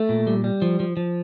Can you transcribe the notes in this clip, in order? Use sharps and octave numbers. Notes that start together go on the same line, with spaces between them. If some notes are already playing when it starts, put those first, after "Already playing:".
Already playing: A3
A#2
G3
G3
F3
F3
F3